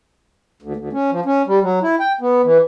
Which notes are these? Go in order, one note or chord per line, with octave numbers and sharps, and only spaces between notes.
D2
D2
C#4
F3
C#4
G3
F#3
E4
G5
B3
E3